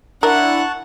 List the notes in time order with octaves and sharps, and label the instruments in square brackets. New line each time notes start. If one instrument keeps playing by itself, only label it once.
[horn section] D4 E4 [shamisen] A#4 [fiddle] F#5 [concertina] A5 C#6 F#6